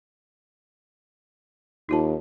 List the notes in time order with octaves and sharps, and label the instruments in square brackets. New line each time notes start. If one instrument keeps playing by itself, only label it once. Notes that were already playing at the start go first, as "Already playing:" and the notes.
[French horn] D#2 [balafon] D#4 F4 A5